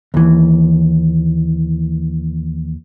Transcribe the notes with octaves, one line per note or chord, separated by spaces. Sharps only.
D#2 E3